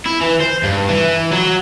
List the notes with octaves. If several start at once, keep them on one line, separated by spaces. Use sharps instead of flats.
E4
E3
C5
G2
E3
F#3